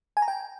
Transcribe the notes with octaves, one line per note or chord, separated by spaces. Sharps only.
G#5
A#5
G5